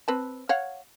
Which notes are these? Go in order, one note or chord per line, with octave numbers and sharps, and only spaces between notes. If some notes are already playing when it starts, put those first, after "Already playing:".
C4 B4 A5
C#5 F5 F#5